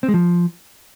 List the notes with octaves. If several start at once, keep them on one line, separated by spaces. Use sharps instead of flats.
C4
G#3
F3